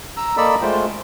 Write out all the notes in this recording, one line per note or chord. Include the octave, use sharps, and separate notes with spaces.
A#5 E6
A#3 A4 D5 D#5 B5 E6
G#3 A3 F4 C5 G5